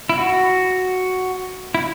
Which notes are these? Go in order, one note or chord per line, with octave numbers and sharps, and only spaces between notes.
E4
F#4
E4